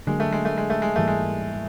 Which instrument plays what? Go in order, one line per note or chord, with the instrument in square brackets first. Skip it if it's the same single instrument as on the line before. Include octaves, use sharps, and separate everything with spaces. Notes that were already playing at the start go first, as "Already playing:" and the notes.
[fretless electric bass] D3 F#3 A#3 [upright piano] G#3
[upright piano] A3
G#3
A3
G#3
A3
G#3
[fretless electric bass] G#2 E3 G3 A#3 [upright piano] A3
[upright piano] G#3